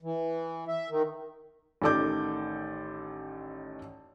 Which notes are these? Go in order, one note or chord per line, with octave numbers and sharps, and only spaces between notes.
E3
E5
D#3
A1 D#3 A4 D5 D6 G6